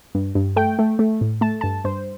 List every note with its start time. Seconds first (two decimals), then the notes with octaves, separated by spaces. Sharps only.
0.15 G2
0.35 G2
0.56 A3 G5
0.79 A3
0.99 A3
1.21 A2
1.41 A3 A5
1.61 G2 A5
1.85 G2 C5